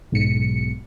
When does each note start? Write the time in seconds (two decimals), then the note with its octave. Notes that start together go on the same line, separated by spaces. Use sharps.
0.12 B1 G#2 C#7